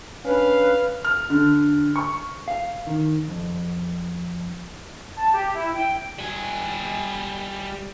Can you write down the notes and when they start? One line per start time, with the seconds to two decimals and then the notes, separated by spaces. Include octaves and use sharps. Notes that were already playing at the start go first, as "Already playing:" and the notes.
0.25 C#4 D4 B4 F5
1.04 F6
1.30 D3
1.96 C#6
2.48 F5
2.87 D#3
3.28 F2
5.17 A5
5.32 G4
5.54 E4
5.74 G5
6.18 G3 G#5